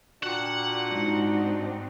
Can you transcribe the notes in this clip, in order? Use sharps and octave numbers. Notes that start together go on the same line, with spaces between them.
A#2 D4 F#4 G4 F#5
G#2 C4 D#4